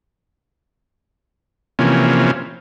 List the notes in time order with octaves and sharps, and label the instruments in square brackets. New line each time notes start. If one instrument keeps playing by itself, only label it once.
[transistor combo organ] C3 E3 F3 A#3 C#4